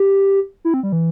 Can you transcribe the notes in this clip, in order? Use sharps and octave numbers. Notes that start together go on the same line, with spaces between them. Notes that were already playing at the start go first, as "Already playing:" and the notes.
Already playing: G4
E4
C4
G3
E3